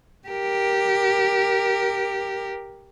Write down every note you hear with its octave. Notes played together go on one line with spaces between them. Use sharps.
G4 A#4